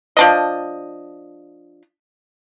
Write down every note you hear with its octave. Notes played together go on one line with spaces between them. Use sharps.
F3 D4 D#5